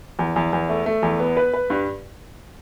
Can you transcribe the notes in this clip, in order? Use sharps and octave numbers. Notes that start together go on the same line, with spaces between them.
E2
E2
E2
A3
A3
E2
B3
B4
B4
G2